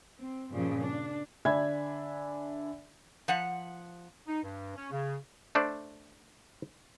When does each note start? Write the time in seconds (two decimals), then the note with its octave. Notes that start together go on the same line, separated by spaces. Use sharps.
0.19 C4
0.50 G2 A#2 C#3 F3
0.82 D4
1.45 D3 D4 E5 G#5 B5 G#6
3.28 F3 F#5
4.27 D#4
4.43 G2
4.75 C#4
4.91 C#3
5.55 A3 D4 C5 D5